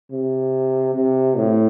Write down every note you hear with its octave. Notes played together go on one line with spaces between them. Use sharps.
C3
C3
A2